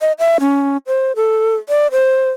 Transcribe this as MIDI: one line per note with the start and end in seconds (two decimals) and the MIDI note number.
0.01 0.12 75
0.19 0.37 76
0.40 0.77 61
0.87 1.12 72
1.16 1.56 69
1.69 1.87 74
1.92 2.30 72